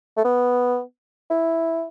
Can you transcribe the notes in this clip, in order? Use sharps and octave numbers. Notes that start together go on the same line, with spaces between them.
A3
B3
E4